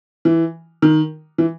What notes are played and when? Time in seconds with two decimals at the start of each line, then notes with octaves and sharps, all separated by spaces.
0.25 E3
0.82 D#3
1.38 E3